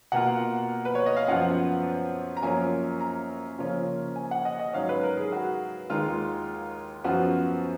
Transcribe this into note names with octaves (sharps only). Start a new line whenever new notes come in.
B2 A#3 F4 F#5
B4
C#5
D#5
F5
F#2 F3 B3 F4 F#5
A#5
F#2 F3 A#3 C#4 F4 G#5
A#5
C#3 F3 A#3 C#4 F4
G#5
F#5
D#5
D#5
G#2 F#3 C#4 F5
B4
A#4
G#4
F#4
D#2 D#3 G#3 D#4 F4
F#2 F3 B3 F4 F#4